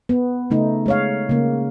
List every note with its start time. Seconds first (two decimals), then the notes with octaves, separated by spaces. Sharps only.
0.09 B3
0.51 C#3 A3 D#4
0.86 G#3 C#5 F5
1.29 C#3 A#3